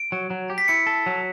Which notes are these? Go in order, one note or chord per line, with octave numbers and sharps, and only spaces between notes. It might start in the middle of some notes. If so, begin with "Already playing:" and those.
Already playing: D7
F#3
F#3
G4
B6
E4 C#7
A4
F#3